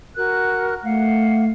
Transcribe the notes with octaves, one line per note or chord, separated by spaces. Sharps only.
F#4 A#4 F#6
A3 F5 F#5